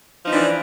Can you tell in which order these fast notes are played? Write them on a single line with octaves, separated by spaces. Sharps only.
F3 D#4 E3 D4